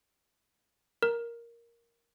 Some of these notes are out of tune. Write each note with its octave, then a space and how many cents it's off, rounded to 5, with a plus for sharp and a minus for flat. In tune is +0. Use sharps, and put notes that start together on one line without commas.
A#4 +5